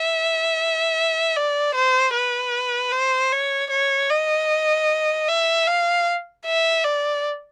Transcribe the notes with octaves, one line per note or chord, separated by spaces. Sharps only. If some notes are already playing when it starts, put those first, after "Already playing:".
Already playing: E5
D5
C5
B4
C5
C#5
C#5
D#5
E5
F5
E5
D5